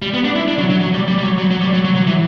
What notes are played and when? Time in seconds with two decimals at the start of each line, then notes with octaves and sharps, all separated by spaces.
0.02 G3
0.14 B3
0.25 D4
0.36 E4
0.48 D4
0.58 F#3
0.70 F#3
0.81 F#3
0.94 G3
1.08 G3
1.19 G3
1.23 F#3
1.38 F#3
1.51 F#3
1.61 G3
1.73 F#3
1.85 F#3
1.95 F#3
2.07 E3